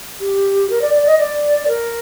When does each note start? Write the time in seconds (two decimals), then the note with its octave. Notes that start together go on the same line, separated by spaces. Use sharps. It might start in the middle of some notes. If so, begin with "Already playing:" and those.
0.21 G4
0.70 A#4
0.82 D5
0.94 D5
1.07 D#5
1.19 D5
1.68 A#4